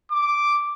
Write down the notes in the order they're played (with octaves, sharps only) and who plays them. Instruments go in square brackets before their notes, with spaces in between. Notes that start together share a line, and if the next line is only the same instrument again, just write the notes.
[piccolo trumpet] D6